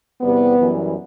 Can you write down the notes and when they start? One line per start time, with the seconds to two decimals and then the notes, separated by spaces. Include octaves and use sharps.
0.21 E2 C3 E3 G3 B3
0.57 F#2 E3 G3